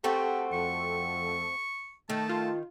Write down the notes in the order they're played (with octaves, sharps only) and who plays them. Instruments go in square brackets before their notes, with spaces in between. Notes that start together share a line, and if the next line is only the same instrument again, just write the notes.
[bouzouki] A3 C4 F#4 [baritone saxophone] G4 [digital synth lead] A4
[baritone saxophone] F2 [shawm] C#6
[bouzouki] D#3 [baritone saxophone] A3 [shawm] A5
[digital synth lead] F4